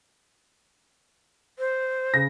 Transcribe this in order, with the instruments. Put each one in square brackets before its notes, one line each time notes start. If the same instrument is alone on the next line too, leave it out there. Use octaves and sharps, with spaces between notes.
[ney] C5
[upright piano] C#3 A#6